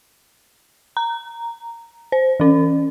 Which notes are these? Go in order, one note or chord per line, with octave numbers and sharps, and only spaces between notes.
A#5
C5
E3 C#4